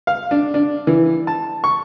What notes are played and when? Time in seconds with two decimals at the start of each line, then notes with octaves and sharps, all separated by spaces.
0.07 F5
0.31 D4
0.54 D4
0.87 E3
1.27 A5
1.64 C#6